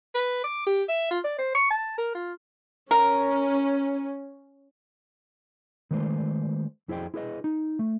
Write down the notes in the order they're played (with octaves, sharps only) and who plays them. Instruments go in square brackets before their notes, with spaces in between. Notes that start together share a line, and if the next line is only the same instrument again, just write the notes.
[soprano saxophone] B4
D6
G4
E5
F4
D5
C5
C#6
A5
A#4
F4
[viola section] C#4 [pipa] A#4
[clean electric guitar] D#3 G#3 A3 B4 C5
F2 E4 G#4 C5 D#5 G5
E4 G#4 B4 D#5
D#4
A3